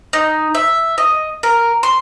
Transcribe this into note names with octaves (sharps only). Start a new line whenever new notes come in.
D#4
E5
D#5
A#4
C6